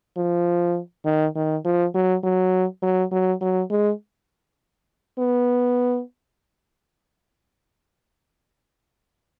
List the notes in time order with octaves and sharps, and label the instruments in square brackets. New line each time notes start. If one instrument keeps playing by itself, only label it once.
[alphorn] F3
D#3
D#3
F3
F#3
F#3
F#3
F#3
F#3
G#3
B3